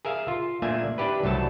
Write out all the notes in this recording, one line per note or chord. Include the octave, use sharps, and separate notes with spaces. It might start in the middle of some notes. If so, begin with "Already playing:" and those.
G#4 A#4 E5 F5
F4
A#2 A3 A#3 D4 E5 G#5
D4 E4 G4 B4
C2 G2 F#3 A3 A4 A5